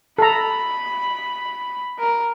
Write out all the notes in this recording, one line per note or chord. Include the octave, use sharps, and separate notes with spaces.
A4 A#5 B5
A#4